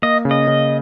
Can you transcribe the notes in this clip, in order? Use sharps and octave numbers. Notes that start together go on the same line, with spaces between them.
A#3 D#5
C#3
D#5
C#3